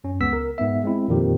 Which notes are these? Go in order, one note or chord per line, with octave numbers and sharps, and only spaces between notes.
F#2 C#4
C#2 B3 E6 B6
A#4
G#2 B3 E5
G#3 C4 E4
F2 A#2 D#3 F3 G4